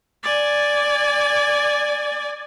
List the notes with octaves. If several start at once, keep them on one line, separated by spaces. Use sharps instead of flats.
D5 G#5